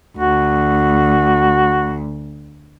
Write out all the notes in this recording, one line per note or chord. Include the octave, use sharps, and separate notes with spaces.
D2 F#4